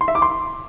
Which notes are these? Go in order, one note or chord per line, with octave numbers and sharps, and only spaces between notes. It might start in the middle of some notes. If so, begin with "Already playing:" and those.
C6
E5
D6
C6